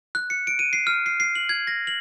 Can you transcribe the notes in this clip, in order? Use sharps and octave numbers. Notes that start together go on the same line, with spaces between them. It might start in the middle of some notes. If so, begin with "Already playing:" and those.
F#6
C#7
D7
D#7
C7
F6
C7
C7
F#7
G#6
A#6
F#7